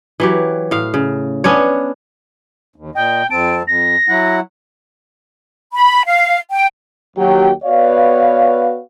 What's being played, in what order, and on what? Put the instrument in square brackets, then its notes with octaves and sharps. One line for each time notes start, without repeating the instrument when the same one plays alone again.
[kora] E3 F#3 G4
A2 F5
C#3
B3 C#4 D4 C#5
[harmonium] D#2
[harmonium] A#2 D#5 [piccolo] G5
[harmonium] F2 C4 A5 [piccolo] D7
[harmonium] F2 [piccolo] A#6
[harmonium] F#3 E4 F#5
[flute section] B5
F5
G5
[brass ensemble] D#2 F#3 G4 G5
B3 F#4 B4 C#5 D5 F5